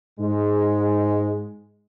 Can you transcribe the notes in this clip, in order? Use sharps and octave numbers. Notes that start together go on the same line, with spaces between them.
G#2 G#3